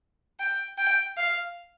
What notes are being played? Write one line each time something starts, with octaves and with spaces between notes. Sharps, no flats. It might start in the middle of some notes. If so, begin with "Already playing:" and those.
G5
G5
F5